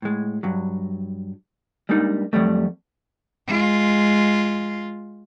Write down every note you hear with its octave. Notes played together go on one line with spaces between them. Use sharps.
A2 G#3
G2 F#3
G3 G#3 A#3 D4 D#4
F2 C#3 F#3 G3 A3
G#3 F4